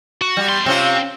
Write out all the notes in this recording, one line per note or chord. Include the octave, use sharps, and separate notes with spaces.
F#4
G3
E2 C6
C3 C4 C#4 F4